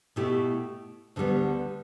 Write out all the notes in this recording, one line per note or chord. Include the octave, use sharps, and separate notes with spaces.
B2 A3 E4 G4
D2 D3 G3 B3